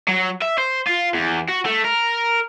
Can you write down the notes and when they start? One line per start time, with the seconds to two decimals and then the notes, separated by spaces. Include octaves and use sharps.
0.09 F#3
0.42 E5
0.58 C5
0.87 F4
1.14 E2
1.48 F#4
1.66 A3
1.85 A#4